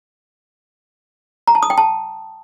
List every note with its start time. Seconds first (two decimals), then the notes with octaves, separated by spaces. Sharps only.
1.47 A#5
1.55 A5
1.63 D#6
1.70 G5
1.78 A5